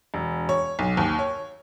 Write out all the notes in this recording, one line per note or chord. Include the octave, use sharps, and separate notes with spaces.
E1
C#5
B1
D#2
C#5